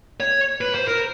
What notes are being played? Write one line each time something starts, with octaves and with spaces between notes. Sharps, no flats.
C#5
B4
C5
A#4